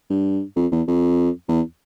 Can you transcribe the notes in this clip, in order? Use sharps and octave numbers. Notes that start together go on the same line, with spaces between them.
G2
F2
E2
F2
E2